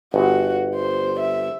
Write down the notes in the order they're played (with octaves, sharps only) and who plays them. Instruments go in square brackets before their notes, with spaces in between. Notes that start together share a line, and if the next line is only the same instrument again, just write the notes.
[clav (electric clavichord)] G1 [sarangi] F#4
[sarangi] C5
E5